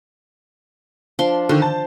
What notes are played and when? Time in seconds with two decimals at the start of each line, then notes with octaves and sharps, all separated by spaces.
1.19 F3 D4 C6
1.49 D3 D#3 C5
1.62 A5